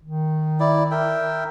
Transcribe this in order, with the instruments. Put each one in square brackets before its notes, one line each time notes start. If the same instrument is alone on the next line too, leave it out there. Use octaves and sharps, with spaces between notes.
[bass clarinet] D#3
[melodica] E4 D5
A#4 E5 G5